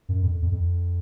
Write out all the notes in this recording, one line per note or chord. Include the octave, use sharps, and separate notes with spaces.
F#2
F2
F2
F2